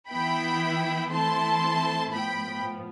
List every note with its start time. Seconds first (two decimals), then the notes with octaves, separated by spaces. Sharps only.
0.10 E3 B3 E4 G5 B5
1.11 E3 A3 C4 E4 A5 C6
2.13 A2 F3 B3 G5 B5